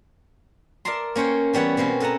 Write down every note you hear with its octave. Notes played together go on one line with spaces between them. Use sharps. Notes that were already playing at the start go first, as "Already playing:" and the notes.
A#4 D5 E5 A5 A#5 C6
A#3 C#4 C5 C#5 G5
E3 G3 B3 C#5 F#5
B2 A#3 C4 C#4
A4 D#5 F#5 A5 A#5